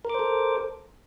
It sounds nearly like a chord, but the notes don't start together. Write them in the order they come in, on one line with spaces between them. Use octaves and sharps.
A#4 D6 C5 A4